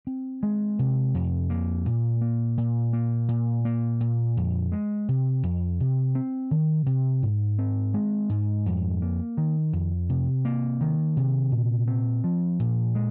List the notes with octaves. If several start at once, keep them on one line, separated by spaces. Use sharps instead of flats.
C4
G#3
C3
F2
A#3
A#2
A#3
A#2
A#3
A#2
A#3
A#2
F2
G#3
C3
F2
C3
C4
D#3
C3
G#2
C4
G#3
G#2
F2
A#3
D#3
F2
C3
A#3
D#3
C3
A#2
C4
F3
A#2
G#3